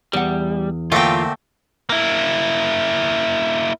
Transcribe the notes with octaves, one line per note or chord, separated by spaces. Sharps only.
E2 G3 F#5
A#2 D3 A3 C4 F4 G5
A#3 E4